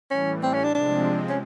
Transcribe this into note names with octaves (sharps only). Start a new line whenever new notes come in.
A2 E3 G3 C#4
C4
C#4
D4
C3 F3 G#3 C4 D4
C#4